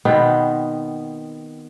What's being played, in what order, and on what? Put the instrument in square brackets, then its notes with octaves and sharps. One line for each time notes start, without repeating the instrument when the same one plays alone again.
[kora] B2 D#3 B3 C4